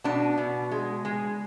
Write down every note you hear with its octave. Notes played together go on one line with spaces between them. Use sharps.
B2 D4
B2
G#3
G#3